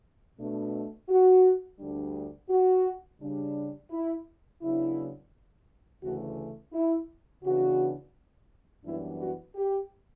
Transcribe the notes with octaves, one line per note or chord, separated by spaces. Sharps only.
B2 A3 D4
F#4
D2 D3 G3 D4
F#4
C#3 G3 D4
E4
C#3 F#3 B3 D4 E4
D2 C#3 E3 A3 F#4
E4
C#3 E3 B3 D4 F#4
F#2 E3 G3 B3 D4 E4
F#4
G4